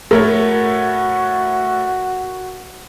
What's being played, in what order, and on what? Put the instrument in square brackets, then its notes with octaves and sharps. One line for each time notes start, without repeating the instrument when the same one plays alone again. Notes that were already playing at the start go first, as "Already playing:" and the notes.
[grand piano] A2 A3 C#5 [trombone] F#4 [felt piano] A#4